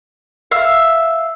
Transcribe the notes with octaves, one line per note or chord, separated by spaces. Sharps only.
E5 F5